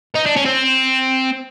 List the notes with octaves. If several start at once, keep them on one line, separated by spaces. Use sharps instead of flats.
D#4
D4
C#4
C4